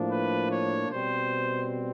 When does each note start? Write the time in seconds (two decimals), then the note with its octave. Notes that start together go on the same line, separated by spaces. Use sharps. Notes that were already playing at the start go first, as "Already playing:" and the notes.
Already playing: A2 F3 A#3 D4
0.11 B4
0.51 C#5
0.90 B2 G3 C4 C5